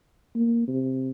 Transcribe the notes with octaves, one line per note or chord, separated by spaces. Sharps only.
A#3
C3